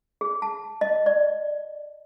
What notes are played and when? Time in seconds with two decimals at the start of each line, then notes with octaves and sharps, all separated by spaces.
0.21 G#4
0.42 A5
0.81 D#5
1.06 D5